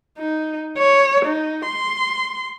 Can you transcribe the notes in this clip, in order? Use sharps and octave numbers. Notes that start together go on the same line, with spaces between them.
D#4
C#5
D#4
C6